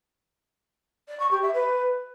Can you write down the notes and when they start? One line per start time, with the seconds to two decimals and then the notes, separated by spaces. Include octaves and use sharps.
1.08 D5
1.19 C#6
1.31 G4
1.42 E5
1.53 B4